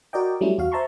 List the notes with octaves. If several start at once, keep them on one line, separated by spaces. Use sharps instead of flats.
F#4 A#4 D5 D#5 G5
F#3 G3 A3 C#4 E4
E2 F#4 F5
C5 E5 A5 A#5 C6 C#6